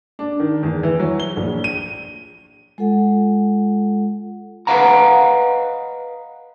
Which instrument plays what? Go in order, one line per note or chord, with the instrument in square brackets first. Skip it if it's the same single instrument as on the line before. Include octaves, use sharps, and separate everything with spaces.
[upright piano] D4
D#3
E2
E3
F#3
G7
A#1
D#7
[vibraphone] G#3 F4 A4 F#5
[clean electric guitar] B4 D#5 F5 F#5 A#5